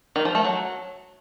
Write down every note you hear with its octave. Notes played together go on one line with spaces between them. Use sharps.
D#3
F3
A3
F#3